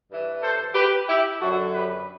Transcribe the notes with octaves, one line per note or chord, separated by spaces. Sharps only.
G2 E3
A4 C5
G4 B4
E4 G4
F#2 D3 F#3 F#4 A4
G4 B4